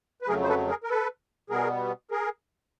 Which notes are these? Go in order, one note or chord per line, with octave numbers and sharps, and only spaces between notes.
B4
F2 C#3 F#3 A3 G#4 A#4
C5
A4 B4
G#4 A#4
A#4
A4 B4
B2 G3 B3 G#4 A#4
G#4 A#4